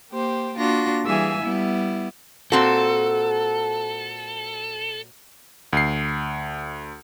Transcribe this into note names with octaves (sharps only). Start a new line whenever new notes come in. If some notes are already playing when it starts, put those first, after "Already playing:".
A#3 G4 C5
A#3 D4 F4 F#4 A#6
E3 G3 G#4 E5 F5 G#5
G3 B3 E4
A#2 C4 F#4 A4
D2 C7